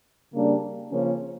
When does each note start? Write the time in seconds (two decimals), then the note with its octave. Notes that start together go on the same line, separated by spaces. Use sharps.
0.33 C#3 G3 A#3 D4
0.91 C#3 F3 A#3 C#4